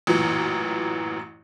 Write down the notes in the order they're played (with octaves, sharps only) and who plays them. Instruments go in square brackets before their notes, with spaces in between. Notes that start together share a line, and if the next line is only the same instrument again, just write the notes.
[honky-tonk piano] A1 F#2 A#2 E3